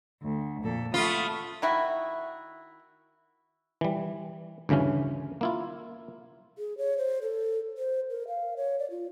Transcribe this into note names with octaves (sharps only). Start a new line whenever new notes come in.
D2
F2 A#2 A4
A3 F4 F#5 B5 D#6
D#3 E4 F#4
E3 G3
D2 G2 C#3 E3 C#4
A#3 E4 F4
G#4
C#5
C5
A4
C5
A#4
F5
C#5
D5
F4